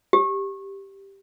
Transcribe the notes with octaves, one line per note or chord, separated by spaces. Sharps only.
G4